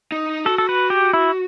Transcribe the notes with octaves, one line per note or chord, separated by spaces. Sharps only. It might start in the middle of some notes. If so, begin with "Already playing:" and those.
D#4
F#4 A4
A4
B4
G4
E4